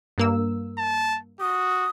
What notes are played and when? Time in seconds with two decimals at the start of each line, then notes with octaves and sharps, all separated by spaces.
0.18 G2 A#3 E6
0.78 A5
1.40 F#4 D#6